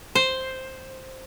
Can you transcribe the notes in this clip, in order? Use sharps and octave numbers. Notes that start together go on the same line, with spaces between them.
C5